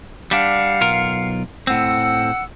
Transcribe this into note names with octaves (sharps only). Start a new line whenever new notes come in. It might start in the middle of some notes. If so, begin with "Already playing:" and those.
G3 D4 F5 F#5
B1 F4 A#4
A2 C4 F#5 E6